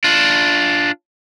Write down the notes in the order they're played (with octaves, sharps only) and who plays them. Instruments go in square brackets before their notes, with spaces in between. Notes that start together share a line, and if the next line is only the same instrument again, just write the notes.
[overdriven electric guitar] D4 F4